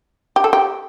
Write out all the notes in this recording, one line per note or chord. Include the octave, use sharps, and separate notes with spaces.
G4
A4
G4